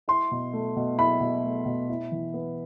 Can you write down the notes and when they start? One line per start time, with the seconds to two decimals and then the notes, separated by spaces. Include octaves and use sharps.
0.08 E4 C6
0.31 B2
0.53 A3
0.76 B2
0.98 E4 B5
1.21 B2
1.44 A3
1.66 B2
1.89 E4
2.12 E3
2.34 B3